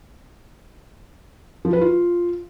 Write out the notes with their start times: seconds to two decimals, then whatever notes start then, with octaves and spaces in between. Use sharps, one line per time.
1.65 F3
1.73 B4
1.81 F4